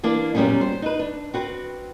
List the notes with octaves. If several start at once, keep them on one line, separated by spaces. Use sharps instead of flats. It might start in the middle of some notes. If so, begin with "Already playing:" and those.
E3 A#3 D4 D5
F#2 A#2 C#3 G3 B3 C#4
C5
D#4 B4
D4
C4 F#4 B4